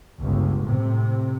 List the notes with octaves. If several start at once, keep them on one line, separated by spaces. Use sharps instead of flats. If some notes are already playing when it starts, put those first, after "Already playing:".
G1 C#2
A2 C3